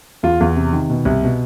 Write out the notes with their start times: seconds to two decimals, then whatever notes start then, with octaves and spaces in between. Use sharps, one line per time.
0.23 E2 F4
0.40 E2
0.56 C3
0.73 D#3
0.90 B2
1.05 C2
1.23 B2